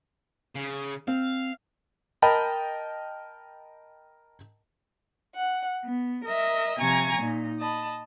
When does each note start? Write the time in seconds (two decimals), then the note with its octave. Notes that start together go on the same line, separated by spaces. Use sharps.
0.56 C#3
1.08 C4 F5
2.22 A#4 D#5 G5 A5 B5
5.37 F#5
5.85 B3
6.26 A#4 D#5 E5
6.77 C3 F3 G#5 A#5 C#6 G#6
7.18 A#2 D#4
7.59 D#5 A5 B5